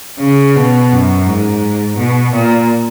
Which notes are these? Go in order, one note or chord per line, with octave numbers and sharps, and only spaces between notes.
C#3
B2
F#2
G#2
B2
A#2